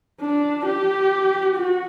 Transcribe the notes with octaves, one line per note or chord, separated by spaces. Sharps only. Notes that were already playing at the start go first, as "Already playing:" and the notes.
D4
G4
F#4